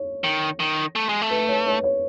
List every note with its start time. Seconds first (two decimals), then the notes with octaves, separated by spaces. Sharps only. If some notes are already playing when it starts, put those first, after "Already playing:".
Already playing: C#5
0.24 D#3
0.60 D#3
0.96 A3
1.09 G#3
1.22 A3
1.31 B4
1.49 C#5
1.66 C#5
1.84 C#5